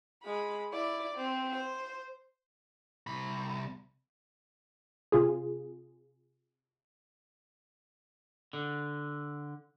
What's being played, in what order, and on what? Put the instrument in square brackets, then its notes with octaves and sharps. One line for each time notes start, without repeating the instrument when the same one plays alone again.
[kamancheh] G#3 B5
E4 D5
C4
C5
[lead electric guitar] C2 B5
[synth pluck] C3 F4 G#4
[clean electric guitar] D3